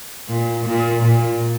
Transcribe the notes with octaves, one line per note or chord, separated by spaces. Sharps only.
A#2
A#2
A#2